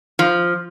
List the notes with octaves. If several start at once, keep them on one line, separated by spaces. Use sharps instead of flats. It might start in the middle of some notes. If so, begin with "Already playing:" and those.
F3